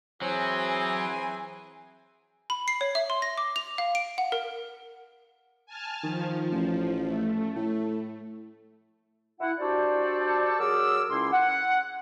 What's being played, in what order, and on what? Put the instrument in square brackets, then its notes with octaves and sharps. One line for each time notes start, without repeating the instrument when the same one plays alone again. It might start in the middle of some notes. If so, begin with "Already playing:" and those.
[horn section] E3 C4 G#4 [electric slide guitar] F#3 [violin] G#5
[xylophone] B5
C7
C#5
E5
C6
A#6
D6
F7
F5
D7
F#5
A#4
[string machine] G#5 A5 F6
[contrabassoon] D#3 [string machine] F3
[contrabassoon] A1
[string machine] A3
[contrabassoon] A2
[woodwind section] E4 F#5
D4 F#4 G4 A4 C5 D5
F#3 G#4 A#4 D6 E6
C#2 C#4 E4 C6
F#5